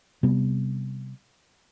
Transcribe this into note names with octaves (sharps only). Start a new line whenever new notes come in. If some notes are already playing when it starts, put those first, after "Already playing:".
C3 G3 B3